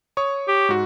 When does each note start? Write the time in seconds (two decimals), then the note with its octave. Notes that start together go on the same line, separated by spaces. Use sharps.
0.17 C#5 C#6 D#6
0.48 G4
0.69 G#2 F#4